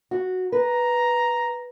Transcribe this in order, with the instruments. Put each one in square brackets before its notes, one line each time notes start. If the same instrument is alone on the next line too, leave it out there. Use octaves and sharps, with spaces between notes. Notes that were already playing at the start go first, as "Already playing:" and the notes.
[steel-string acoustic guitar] F#4
[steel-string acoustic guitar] B4 [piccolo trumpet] A#5